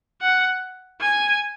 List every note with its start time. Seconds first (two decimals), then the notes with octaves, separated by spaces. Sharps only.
0.22 F#5
1.01 G#5